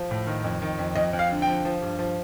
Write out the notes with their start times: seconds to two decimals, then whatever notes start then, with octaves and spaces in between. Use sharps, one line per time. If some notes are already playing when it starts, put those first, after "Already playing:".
Already playing: F3
0.11 A2
0.27 D#3
0.44 F2
0.62 D#3
0.79 F2
0.95 F2 D#5
1.13 F2
1.19 F5
1.31 D3
1.42 F3 G5
1.65 F3
1.82 G2
1.99 F3